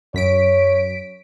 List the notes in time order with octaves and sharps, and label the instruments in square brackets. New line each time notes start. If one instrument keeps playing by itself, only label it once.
[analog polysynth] F#2 B6 D7 [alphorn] C#5